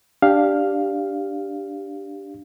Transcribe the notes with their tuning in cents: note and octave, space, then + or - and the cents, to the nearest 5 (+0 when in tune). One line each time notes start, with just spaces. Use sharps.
D4 +0 G4 +0 F5 +0